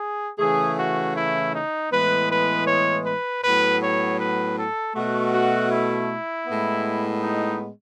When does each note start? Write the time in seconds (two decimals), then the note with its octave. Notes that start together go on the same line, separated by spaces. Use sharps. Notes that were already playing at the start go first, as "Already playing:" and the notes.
Already playing: G#4
0.39 C#3 E3 A3 G#4
0.77 F#4
1.15 E4
1.53 D#4
1.91 A2 E3 G#3 B3 B4
2.29 B4
2.67 C#5
3.05 B4
3.43 A2 F#3 B3 B4
3.81 C#5
4.19 B4
4.57 A4
4.95 B2 A3 F#4
5.33 F#4
5.71 E4
6.47 A2 G#3 B3
7.23 D#4